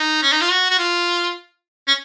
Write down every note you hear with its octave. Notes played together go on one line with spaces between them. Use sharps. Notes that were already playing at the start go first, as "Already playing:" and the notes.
Already playing: D#4
C#4
D#4
F4
F#4
F#4
F4
C#4